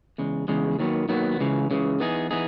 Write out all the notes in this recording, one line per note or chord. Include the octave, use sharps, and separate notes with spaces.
E2 C#3 G#3
E2 C#3 G#3
D#2 D#3 F#3 B3
D#2 D#3 F#3 B3
C#2 C#3 E3
C#2 C#3 E3
E3 B3 D#4 G#4
E3 B3 D#4 G#4